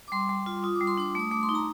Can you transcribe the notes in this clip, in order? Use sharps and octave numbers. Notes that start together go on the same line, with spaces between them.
D6
G3 C6
G3
F4
F4 D#6
D6
G3
C6
D4 D6
A3 D#6
A3 D6
C6
D#4
A#5